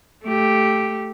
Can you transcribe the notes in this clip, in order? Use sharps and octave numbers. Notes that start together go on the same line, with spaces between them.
A3 G4